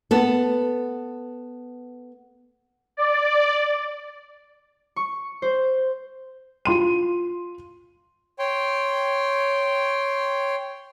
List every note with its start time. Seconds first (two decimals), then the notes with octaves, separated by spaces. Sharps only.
0.11 B3 A4
2.97 D5
4.96 C#6
5.42 C5
6.65 F4 C6 D#7
8.39 C#5 G5 C6